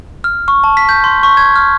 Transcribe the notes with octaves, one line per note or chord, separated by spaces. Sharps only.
F6
C#6
A5
B6
G6
C6
C#6
G#6
F6